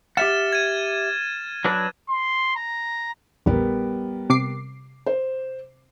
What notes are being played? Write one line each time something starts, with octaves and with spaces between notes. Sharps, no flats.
G4 E5 F#5 F6 A6 E7
G#6 D#7
F#3 D4 B4
C6
A#5
A#1 E2 G3 B3 A#4
C3 D6 C7
C5